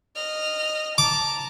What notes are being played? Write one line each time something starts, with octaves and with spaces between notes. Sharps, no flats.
D#5 F6
A5 A#5 D6